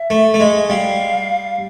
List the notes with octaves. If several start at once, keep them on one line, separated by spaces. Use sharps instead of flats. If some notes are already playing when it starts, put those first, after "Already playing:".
Already playing: E5
A3
A3
G#3
G3 F5